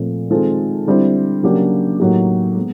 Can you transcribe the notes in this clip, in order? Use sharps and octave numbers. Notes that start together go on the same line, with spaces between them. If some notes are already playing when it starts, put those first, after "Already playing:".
Already playing: A#2 F3 A3 C4
D#3 G#3 C4 F4 A4
D3 G3 C4 E4
C#3 F#3 A#3 D4 G4
A2 F#3 A#3 D#4 G4
G#3 B3